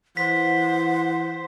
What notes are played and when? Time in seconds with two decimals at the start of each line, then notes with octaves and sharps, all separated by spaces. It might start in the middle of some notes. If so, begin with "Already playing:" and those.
0.17 E3 C5 F#5 B6